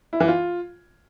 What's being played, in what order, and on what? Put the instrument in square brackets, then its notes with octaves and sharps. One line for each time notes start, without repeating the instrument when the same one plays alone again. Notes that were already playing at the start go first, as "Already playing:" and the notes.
[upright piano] E4
E3
F4